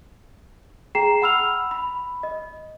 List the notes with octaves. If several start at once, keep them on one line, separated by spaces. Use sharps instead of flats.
G#4 G5 A#5 C7 E7
F#5 B5 E6 F6 F7
B5
D#5